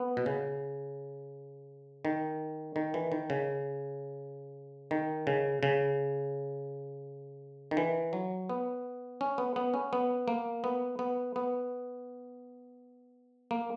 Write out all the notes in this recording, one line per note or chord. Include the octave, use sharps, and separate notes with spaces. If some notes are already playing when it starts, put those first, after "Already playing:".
Already playing: B3
B2
C#3
D#3
D#3
E3
D#3
C#3
D#3
C#3
C#3
D#3
E3
F#3
B3
C#4
B3
B3
C#4
B3
A#3
B3
B3
B3
A#3